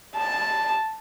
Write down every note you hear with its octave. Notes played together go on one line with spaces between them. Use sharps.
A5